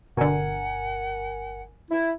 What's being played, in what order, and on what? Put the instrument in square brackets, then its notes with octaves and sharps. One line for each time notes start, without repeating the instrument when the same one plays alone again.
[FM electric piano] G1 A#4 G#5 [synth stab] B2 D3 [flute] F#5
[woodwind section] E4